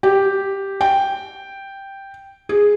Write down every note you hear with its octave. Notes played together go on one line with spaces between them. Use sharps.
G4
G5
G#4